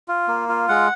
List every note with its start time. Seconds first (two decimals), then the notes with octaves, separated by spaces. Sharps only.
0.08 F4
0.28 A#3
0.49 F4
0.69 G#3 F#5